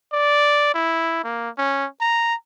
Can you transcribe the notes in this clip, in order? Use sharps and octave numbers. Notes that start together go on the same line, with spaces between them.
D5
E4
A#3
C#4
A#5